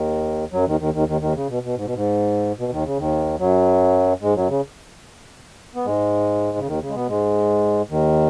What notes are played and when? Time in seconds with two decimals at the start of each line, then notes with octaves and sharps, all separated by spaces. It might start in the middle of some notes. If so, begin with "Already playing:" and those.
Already playing: D#2 D#3
0.53 F#2 F#3
0.67 D#2 D#3
0.80 D#2 D#3
0.94 D#2 D#3
1.08 D#2 D#3
1.21 D#2 D#3
1.35 C#3
1.49 B2
1.63 B2
1.76 G#2
1.85 B2
1.95 G#2
2.58 B2
2.72 D#2 D#3
2.86 C#3
2.99 D#2 D#3
3.39 F#2 F#3
4.22 G#2 G#3
4.36 F#2 F#3
4.49 C#3
5.75 B3
5.86 G#2 G#3
6.58 C#3
6.67 D#2 D#3
6.82 C#3
6.89 G#3
6.95 B2 B3
7.08 G#2 G#3
7.90 D#2 D#3